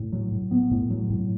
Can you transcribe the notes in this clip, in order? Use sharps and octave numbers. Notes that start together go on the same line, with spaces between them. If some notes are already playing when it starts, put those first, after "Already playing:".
Already playing: A2
F#3
A2
B3
A2
F#3
A2